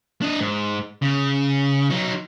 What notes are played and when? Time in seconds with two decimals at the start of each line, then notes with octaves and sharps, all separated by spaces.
0.22 D4 D#5
0.40 G#2
1.02 C#3
1.90 F#3 D#4